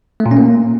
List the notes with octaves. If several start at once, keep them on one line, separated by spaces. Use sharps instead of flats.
A3
A#2
C#4
A#3